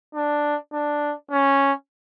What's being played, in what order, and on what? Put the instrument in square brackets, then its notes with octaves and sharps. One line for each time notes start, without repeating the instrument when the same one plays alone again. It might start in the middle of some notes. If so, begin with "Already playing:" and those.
[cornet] D4
D4
C#4